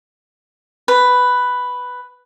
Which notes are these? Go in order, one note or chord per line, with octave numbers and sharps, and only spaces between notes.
B4